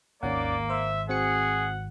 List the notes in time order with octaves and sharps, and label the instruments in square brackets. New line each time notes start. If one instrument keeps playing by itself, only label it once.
[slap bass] G#1 [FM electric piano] D#2 C#4 F#5 [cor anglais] A#3 [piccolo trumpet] D5
[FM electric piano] C5 [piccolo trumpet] E5
[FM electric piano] C4 F#4 C#7 [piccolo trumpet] G#4 [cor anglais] F#5